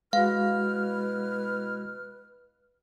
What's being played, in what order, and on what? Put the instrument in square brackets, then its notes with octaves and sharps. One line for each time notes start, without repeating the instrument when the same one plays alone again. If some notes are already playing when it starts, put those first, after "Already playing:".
[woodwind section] B2 E4 F6 [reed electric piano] G#3 F#4 [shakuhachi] B4 [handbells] F5